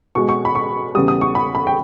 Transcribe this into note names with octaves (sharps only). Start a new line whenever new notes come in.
B2 G#3 C#6
C#6
B5
C#6
E2 C#3 G3 D#6
D#6
C#6
B5
B5
G5